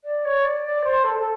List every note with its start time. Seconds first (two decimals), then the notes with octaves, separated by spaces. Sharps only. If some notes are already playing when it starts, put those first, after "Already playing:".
0.04 D5
0.24 C#5
0.44 D5
0.64 D5
0.84 C5
1.03 A4
1.19 A4